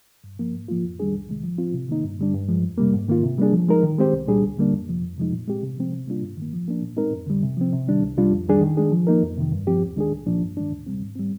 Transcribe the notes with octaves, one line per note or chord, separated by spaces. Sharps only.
G2
F3 A#3
G#2
F3 A#3 F4
F2
D#3 G3 D4 G#4
C2
C3 D#3 G#3
F3
C4 F4
C3
D#3 A#3 D#4
G2
D3 G3 D4
G2
F3 G#3
F2
C3 G3 A#3
G#2
D#3 A#3 F4
C3
G3 A#3 D4 G#4
F3
G#3 D#4 A#4
D#3
G#3 C4 G4 C5
C2
A#2 G3 D4 G#4
D2
D3 G3 A#3 D4
F2
C3 F3
F2
C3 F3 G#3 D#4
A#2
G#3 C4 G4
C3
F3 G#3 C4
C3
G3 A#3 D4 F4
G2
D#3 A#3
F3
A#3 D4
A#2
G#3 C4 D#4 A#4
F2
D3 G3
C3
F3 C4
C3
D#3 G3 D4
C2
C3 G3 D4 F4
F2
D#3 G3 D4 G#4
D#3
G#3 D4 G#4
F3
A#3 D#4 A#4
F2
C3 D#3
G2
F3 C4 G4
D#2
D#3 G#3 D4 G#4
C2
A#2 F3 A#3 D4
G2
D#3 G#3 D4
D2
C3 G3 C4
G#2
G3 C4